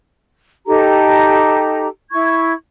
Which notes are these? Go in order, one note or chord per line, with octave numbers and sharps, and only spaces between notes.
D#4 G4 A4 A#5
E4 C#6 G#6